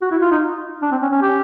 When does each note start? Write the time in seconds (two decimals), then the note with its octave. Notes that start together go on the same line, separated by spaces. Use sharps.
0.02 F#4
0.11 E4
0.22 F4
0.32 D#4
0.82 D4
0.92 C4
1.02 C#4
1.12 C#4
1.22 G4